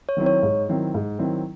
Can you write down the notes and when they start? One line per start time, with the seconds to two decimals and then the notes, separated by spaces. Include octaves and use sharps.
0.09 C#5
0.17 D#3 F#3 C4 E4
0.26 C#5
0.43 G#2
0.69 D#3 F#3 C4 E4
0.94 G#2
1.19 D#3 F#3 C4 E4